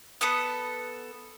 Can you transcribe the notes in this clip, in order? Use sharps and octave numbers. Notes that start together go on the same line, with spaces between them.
B3 A4 B4 D#6